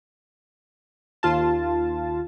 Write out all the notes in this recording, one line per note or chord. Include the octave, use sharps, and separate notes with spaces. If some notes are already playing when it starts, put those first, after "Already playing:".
D#2 F4 A5